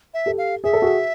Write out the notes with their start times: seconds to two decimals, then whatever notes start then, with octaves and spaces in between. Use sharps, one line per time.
0.14 E5
0.26 G4 A4
0.38 F5
0.64 G#4 E5
0.73 A4
0.82 F#4 G#4